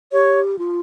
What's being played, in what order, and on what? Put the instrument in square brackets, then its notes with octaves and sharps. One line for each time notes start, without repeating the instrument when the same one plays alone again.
[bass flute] G4 [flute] C#5
[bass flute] F4